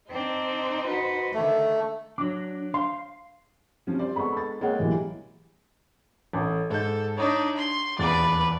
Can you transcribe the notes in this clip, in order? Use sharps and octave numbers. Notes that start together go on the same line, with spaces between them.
C4 D4 D#4 C5
F#4 B4
D3 D#3 A3
F#3 D4 D6
F5 C6
C3 F3 G3 C#4
C5 D5
G#3 B3 A4 B5 C#6
A6
G#3 A#3 C#5 F#5 G5
B1 E3 G3
A1 A3
G#2 A4 G6
D4 D#4 C#5
C6
D#1 E2 B4 D5 A6